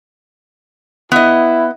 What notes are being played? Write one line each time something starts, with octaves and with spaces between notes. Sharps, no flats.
B3 E4 D#5